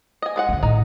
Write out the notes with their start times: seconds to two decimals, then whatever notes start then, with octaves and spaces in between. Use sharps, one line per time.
0.22 D#5 G#5
0.36 G#3 B4 F#5
0.49 F2 D3
0.63 A2 D#4